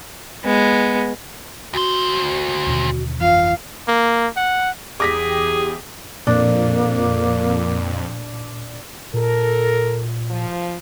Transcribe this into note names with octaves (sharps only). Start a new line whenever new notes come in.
G#3 B3
D2 F#4 C5
D#2 B2 D3
G1 F2 E3 F4 F5
A#3
F#5
E2 G4 G#4 D6 D#6 A#6 B6
F2 A#2 A#3 D4
A#2 A4 A#4
F3